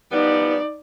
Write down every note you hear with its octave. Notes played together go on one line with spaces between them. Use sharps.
F3 G3 B3 D#4 D5